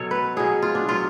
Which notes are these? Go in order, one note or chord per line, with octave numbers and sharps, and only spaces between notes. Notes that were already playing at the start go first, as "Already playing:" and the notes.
Already playing: B2 F#3 A4 C#5
B4
B2 F#3 G#4
F4
D4
B2 F#3 F4